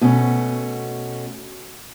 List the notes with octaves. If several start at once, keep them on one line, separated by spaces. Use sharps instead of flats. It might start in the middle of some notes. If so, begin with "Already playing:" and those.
B2 A3 C#4